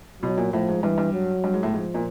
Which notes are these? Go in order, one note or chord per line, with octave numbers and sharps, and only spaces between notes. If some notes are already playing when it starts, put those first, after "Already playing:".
B2 F#3
A#2
A2 F3
G#2
G2 E3
G2
F#3
G2
G#2
A2
G#2 F3
A#2